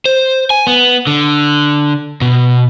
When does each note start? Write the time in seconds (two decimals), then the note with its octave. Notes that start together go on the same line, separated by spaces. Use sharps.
0.06 C5
0.50 G#5
0.67 B3
1.07 D3
2.21 B2